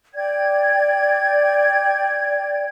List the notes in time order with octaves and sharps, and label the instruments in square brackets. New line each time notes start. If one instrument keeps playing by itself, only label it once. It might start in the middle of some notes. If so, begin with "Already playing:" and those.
[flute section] D5 G5 G#6